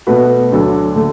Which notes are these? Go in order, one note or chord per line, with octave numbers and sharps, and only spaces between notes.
B2 A3 F#4 B4
D2 D3 F#3 D4 A4
D3 A3